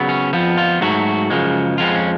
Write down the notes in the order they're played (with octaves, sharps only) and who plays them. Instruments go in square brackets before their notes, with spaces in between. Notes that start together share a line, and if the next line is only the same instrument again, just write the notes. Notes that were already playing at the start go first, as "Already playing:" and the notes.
Already playing: [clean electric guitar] C#3 F#3 B3
C#4
F2 F3 B3
F4
G#2 F#3 A3 F#4
F#2 C#3 F3 G#3
F2 F3 G#3 B3 F4
C#4